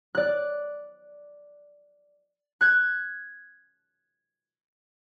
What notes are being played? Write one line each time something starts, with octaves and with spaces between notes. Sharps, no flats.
D5 F#6
F#6 G#6